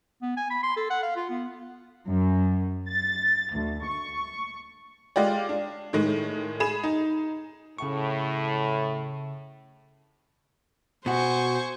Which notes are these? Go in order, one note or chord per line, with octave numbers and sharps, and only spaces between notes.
B3
G#5
B5
C6
A4
F#5
F5
F4
B3
F#2
A6
D2
C#6
G#3 F4 G4 D5
D4
A2 D#3 G#3
G#4 B5 E7
D#4
A2 C#3 C#6
B2 F#4 C5 G#5 C#6